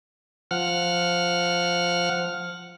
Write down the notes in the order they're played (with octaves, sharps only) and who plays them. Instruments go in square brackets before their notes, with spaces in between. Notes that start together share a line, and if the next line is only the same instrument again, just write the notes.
[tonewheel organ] F3 F#5 F6